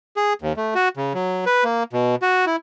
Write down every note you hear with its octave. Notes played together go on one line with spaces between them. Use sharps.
G#4
D#2
A3
F#4
C#3
F#3
B4
A#3
B2
F#4
E4